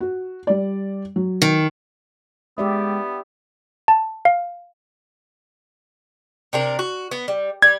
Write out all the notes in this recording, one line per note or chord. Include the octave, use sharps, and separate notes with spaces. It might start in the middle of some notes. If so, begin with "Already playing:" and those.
F#4
G3 D5
F#3
D#3
G#3 B3 G4 D5 E5
A5
F5
C3 D4 A#4
F#4
B3
G3
G3 G#6